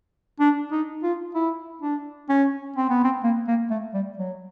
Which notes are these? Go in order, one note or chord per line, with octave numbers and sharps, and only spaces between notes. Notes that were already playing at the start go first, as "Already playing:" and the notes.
D4
D#4
F4
E4
D4
C#4
C4
B3
C4
A#3
A#3
A3
G3
F#3